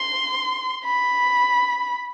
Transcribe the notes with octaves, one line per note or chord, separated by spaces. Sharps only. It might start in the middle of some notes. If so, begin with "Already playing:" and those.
Already playing: C6
B5